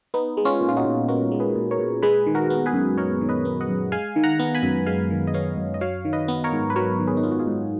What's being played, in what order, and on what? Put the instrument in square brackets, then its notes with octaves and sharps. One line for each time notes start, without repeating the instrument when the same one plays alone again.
[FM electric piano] B3 D#4
G#3
C#4 F4
A#2
F4
D#4 F#4
A#2
B3 F#4 A#4
G#3
G#4 B4
A#2
A#4 C#5
A#2
G#3 G#4 B4
D#3
F#4 A#4
B3
G#4 B4
F#2
G#3 A#4 C#5
D#3
B4 D#5
B3
D#5 F#5
F#2
G#3 F5 G#5
D#3
F#5 A#5
B3
G#5 B5
F#2
G#3 F5 G#5
D#3
D#5
B3 C#5 F5
F#2
D#5
F#3 C#5 F5
D#3
B4 D#5
B3
A#4 C#5
G#2
B4
F#3 A#4 C#5
D#3
G#4 B4
D#4
B3 F4
F#4
F4 G#4
G#2